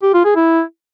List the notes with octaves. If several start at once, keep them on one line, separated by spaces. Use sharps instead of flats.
G4
F4
G#4
E4